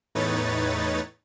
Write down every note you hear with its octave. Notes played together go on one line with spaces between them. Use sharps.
E2 A2 D#4 B4 C#5 A6